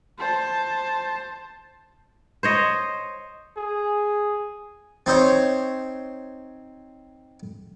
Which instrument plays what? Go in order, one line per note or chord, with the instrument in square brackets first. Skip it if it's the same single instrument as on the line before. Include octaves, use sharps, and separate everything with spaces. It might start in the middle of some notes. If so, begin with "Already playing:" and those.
[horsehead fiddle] C5 A5
[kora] C5 C#5 D#5
[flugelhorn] G#4
[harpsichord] C4 D#4 C5 C#5